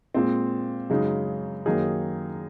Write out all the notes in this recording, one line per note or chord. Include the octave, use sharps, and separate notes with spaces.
A#2 G#3 C4
F#2 C#3 G#3 D#4
F#2 D#3 A#3 D#4 G#4